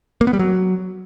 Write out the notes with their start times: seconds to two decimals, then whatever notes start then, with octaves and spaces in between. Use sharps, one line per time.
0.21 A#3
0.27 B3
0.33 G3
0.39 F#3